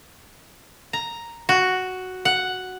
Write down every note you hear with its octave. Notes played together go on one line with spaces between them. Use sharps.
A#5
F#4
F#5